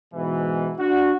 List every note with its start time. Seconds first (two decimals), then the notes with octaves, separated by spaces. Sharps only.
0.14 G#2 B2 E3
0.79 D4 F#4